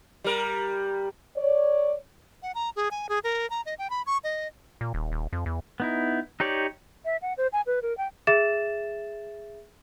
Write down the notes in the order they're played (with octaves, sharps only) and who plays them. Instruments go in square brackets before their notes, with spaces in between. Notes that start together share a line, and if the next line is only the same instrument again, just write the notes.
[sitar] G3 A#4
[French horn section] C#5 D5
[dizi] F#5
A#5
G#4
G#5
G#4
A#4
A#5
D#5
G5
B5
C#6
D#5
[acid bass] A#2
D#1
D#1
F2
E2
[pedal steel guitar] B3 D#4 E4
D#4 G4 C#5 D5
[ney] E5
F#5
C5
G#5
B4
A#4
G5
[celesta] G#4 E5 A6 E7